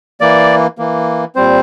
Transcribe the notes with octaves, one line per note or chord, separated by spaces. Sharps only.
E3 A#3 D5
E3 A#3
A#2 G3 C4 C5